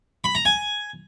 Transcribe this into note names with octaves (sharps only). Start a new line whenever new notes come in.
B5
A#5
G#5